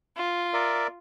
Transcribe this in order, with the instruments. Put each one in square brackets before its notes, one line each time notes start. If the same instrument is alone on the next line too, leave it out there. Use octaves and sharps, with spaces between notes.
[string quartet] F4
[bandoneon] A#4 D5 E5